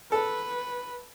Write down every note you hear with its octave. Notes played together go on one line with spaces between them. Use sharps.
A4 B4